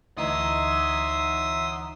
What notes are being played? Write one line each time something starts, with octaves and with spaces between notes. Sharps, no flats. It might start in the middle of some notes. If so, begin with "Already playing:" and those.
D2 E3 D#4 E5 F#5 A#5 C6 D#6